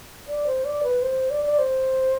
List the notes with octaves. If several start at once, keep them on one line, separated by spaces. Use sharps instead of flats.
D5
C5
D5
B4
C5
D5
D5
C5